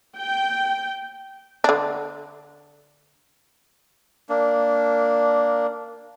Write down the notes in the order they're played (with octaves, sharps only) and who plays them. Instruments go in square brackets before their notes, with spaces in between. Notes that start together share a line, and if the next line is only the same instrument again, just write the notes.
[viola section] G5
[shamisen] D3 D4
[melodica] A#3 D4